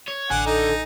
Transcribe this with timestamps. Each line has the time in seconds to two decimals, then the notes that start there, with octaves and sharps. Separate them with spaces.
0.08 C#5
0.30 A1 D3 F#5 G#5
0.46 D#4 A4